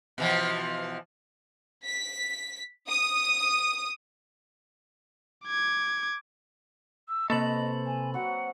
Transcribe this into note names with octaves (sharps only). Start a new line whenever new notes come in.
B2 E3 F3
B6
D#6
D6 G#6
E6
C3 A#3 A4 B4 C5 D#5 B5 F#7
G#5
F#3 C4 F#4 F#5